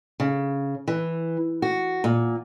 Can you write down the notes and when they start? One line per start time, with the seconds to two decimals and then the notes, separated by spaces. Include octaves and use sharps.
0.20 C#3
0.88 E3
1.62 F#4
2.04 A#2